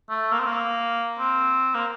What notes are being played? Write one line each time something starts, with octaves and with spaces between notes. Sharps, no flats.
A3
A#3
C4
A#3
C4
A#3